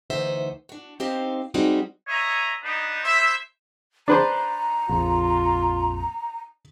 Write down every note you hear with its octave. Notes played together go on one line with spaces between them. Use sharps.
D2 E3 D#4 C5 E5 F#5
D4 F#4
C4 D#4 G4 C5 F5
G3 G#3 C4 D#4 F#4 G4
C#5 D#5 E5 A#5
B3 D4 D#4
E4 C5 E5
D4 B4 C5 A#5
A#1 F2 F4